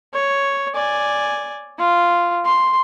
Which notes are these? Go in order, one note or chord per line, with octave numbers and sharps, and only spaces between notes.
C#5
D5 G#5
F4
C6